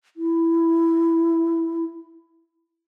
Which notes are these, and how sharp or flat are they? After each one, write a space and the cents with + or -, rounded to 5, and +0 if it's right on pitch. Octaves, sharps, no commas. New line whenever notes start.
E4 +10